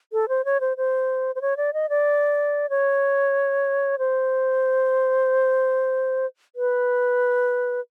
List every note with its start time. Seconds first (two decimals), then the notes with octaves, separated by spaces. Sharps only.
0.13 A4
0.29 C5
0.45 C#5
0.61 C5
0.77 C5
1.35 C5
1.42 C#5
1.57 D5
1.74 D#5
1.89 D5
2.70 C#5
3.99 C5
6.56 B4